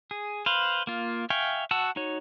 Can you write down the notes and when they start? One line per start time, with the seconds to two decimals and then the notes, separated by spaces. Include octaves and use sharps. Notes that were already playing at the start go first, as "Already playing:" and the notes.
0.11 G#4
0.46 B4 C5 F5
0.87 A#3 F4
1.30 E5 F5 G5 G#5 C#6
1.71 F#4 F#5 A5 E6
1.96 D#4 F#4 C#5